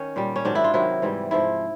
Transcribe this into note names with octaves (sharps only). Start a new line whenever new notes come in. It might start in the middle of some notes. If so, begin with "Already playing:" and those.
Already playing: D#3 C#4
A#2 G3
C#4
G#2 D#3 F#3 D4
E4
F4
C3 D#3 F#3 E4
G#2 E3 G3
G#2 F3 E4